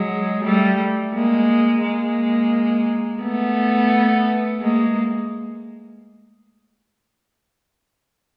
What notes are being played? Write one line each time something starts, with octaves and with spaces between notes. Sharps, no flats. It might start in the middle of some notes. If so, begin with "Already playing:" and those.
Already playing: F#3 G#3
G3 A3
G#3 A#3
G#3 A#3
A3 B3
G#3 A#3